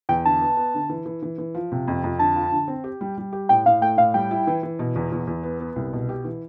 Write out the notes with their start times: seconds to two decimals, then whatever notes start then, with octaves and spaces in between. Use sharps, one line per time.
0.09 E2 G5
0.25 D3 A5
0.42 B3
0.57 B3
0.74 D3
0.89 E3
1.06 E3
1.23 E3
1.38 E3
1.55 F3
1.72 C3
1.88 F2
2.04 F2
2.19 D3 A5
2.36 F3
2.52 D3
2.68 C4
2.84 G4
3.01 G3
3.18 G3
3.33 G4
3.49 A2 G5
3.66 A2 F5
3.81 A3 G5
3.97 A2 F5
4.14 G3 G5
4.31 E4
4.47 E3
4.63 E3
4.79 B2
4.96 E2
5.12 E2
5.27 E2
5.43 B3
5.60 B3
5.76 C2
5.93 B2
6.09 G4
6.24 E3